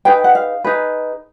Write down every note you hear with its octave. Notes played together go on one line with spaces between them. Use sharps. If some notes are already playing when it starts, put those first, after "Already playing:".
D#4 G#4 B4 G5
F#5
F5
D#4 G#4 B4